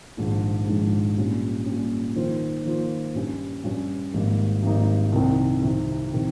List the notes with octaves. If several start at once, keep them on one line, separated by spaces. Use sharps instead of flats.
A#1 G#2 D#3 G#3
A#1 G#2 D#3 G#3
A#2 G3 C#4
A#2 G3 C#4
D#3 A#3 F4 C5
D#3 A#3 F4 C5
G2 G3 C#4
G2 G3 C#4
G#1 G#2 G3 A#3 D#4
G#1 G#2 G3 A#3 D#4
C2 C3 D#3
C2 C3 D#3
C3 D#3